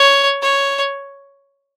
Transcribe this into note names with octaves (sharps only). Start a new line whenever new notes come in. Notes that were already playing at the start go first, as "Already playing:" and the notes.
Already playing: C#5
C#5